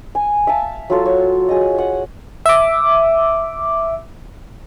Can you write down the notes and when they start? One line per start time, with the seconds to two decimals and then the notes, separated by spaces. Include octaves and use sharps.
0.15 G#5
0.47 E5 F5 A5
0.90 F#3 F4 A4
1.05 C#5
1.49 G#4 D#5
1.75 E5 F#5
2.46 E5 D6